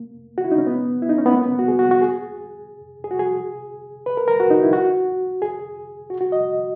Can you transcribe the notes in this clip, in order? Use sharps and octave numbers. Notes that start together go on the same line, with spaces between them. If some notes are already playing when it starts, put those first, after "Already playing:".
Already playing: A#3
F#4
E4
D#4
C#4
B3
E4
D#4
C#4
B3
A#3
B3
F#4
G#4
F#4
F#4
G#4
G#4
F#4
G#4
B4
A#4
A#4
F#4
D#4
E4
F#4
G#4
F#4
F#4
D#5